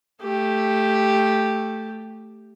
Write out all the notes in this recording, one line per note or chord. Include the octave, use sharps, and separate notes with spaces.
A3 G4